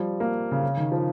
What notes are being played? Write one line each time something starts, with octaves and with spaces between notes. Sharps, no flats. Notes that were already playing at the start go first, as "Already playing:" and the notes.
Already playing: F3 G3
A#3
C#3
C#3
D#3
F3